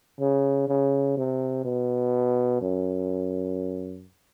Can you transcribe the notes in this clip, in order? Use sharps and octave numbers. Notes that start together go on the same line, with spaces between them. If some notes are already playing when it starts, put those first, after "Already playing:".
C#3
C#3
C3
B2
F#2